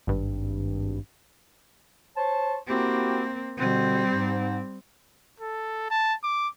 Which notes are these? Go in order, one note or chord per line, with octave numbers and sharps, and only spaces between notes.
G#1 G2
C5 C#5 A5
A#3 C4 E4 F#4 G4
B2 D3 G3 C4
G#2
A4
A5
D6